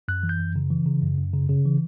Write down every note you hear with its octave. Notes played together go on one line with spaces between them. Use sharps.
F#2 F#6
E3
G6
F#2
C#3
E3
C#3
F#2
F#2
C#3
C#3
E3